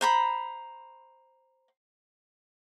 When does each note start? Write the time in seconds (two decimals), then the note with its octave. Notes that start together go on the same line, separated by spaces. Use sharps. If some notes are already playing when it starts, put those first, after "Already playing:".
0.01 C5 A#5 B5